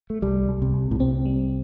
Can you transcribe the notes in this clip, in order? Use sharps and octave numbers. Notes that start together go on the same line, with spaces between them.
A3
C2 G3
C2
C3
C2
A2
C3 C4
G3